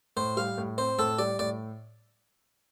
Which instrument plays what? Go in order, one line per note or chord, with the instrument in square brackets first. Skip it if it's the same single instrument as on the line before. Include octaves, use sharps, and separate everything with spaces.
[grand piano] A2 [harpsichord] C5
[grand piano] G3 [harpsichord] F5
[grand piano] A2
[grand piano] C4 [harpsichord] C5
[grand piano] A2 [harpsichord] A4
[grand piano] G3 [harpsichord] D5
[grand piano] A2 [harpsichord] D5